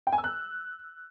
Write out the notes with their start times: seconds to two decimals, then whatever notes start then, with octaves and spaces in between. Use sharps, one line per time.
0.07 G5
0.12 G#5
0.18 E6
0.24 F#6